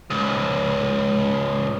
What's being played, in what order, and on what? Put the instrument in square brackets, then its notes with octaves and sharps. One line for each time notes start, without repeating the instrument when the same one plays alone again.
[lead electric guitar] C#2 G#2